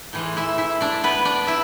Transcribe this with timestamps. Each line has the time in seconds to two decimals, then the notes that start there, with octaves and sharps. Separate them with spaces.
0.13 A2 E3 G#3
0.37 E4 E5
0.58 E4 E5
0.81 D4 D5
1.04 B3 B4
1.25 D4 D5
1.47 E4 E5